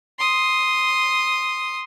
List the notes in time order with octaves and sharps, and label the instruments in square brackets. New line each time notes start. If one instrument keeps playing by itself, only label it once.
[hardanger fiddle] C6 D#6